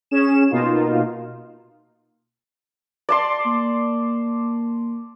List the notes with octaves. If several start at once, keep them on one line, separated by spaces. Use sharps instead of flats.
C#4 G#4 E7
B2 A#3 D#4 F4
D5 A5 C6
A#3